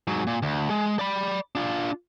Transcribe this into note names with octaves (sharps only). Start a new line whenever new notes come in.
G#2 F#3
A#2
D2
G#3
D5 B5
D4 F4